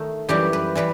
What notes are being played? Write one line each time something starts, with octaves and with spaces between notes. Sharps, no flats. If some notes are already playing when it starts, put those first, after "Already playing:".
Already playing: D#3 A3 D#4
F#2 E3 G3 G4
B4
E3 G3 B4